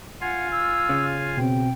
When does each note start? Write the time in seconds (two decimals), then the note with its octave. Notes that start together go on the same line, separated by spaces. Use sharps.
0.21 F4 F5 F#5 G#5
0.52 E6
0.89 C#3
1.37 B2 C4 G5